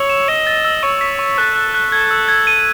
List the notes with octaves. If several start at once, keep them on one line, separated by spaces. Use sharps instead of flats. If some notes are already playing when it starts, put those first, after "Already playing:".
Already playing: C#5 E6
E7
D#5 E7
A6
E6
C#5 C#6
B6
C#6
A4 F#6
F#6
F#6
A4 G#6
E6
G#6
D#7